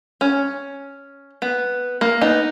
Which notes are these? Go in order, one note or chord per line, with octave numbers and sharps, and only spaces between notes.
C#4
B3
A#3
B3 D#4